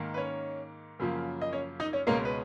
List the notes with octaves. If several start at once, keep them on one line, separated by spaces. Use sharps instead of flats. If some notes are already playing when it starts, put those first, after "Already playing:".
Already playing: G#2 D#3 A#3
B4
C#4 C#5
F#2 C#3 F3 A#3
D#5
C#4 C#5
D#4 D#5
C#4 C#5
C#2 B2 G#3 A#3 C#4 A#4
B4